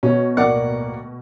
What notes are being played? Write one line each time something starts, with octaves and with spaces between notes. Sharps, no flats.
B2 C#4
D1 A#3 A#4 D5 F#5